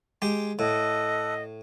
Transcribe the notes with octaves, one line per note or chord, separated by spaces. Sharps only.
G#3 G4
A2 A4 D#5 F#5